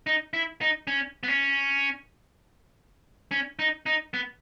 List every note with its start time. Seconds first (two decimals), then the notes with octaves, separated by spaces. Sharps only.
0.07 D#4
0.33 E4
0.61 D#4
0.87 C#4
1.23 B3
1.28 C#4
3.31 C#4
3.59 D#4
3.86 D#4
4.14 B3